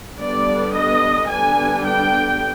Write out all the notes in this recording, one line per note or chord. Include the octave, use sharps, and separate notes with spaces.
D3 G3 B3 D4 D5
D#5
D3 G3 B3 D4 G#5
G5